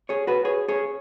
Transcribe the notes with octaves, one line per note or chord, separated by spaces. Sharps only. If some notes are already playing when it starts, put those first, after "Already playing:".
G#4 C#5
F#4 B4
G#4 C#5
G#4 C#5